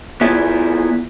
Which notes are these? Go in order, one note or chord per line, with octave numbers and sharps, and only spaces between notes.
B3 E4 F4 G#4